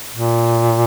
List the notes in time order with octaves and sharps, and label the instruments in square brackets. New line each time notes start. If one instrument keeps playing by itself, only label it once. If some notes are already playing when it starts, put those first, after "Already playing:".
[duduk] A#2